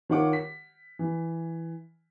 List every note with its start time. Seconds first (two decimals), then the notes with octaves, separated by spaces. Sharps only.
0.10 D#3 F4 C#5 F#5 D6
0.33 B6
0.99 E3